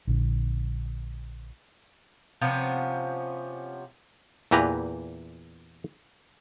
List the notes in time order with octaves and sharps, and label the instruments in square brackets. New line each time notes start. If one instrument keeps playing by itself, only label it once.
[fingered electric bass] A#1 D3
[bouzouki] C3 F3 B3 C#4
[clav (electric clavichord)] E2 A#2 E3 G4 B4 A#5